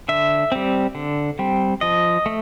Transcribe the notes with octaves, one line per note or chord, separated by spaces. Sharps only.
D3 E5
G3 C4
D3
G3 C4
F3 D#5
A3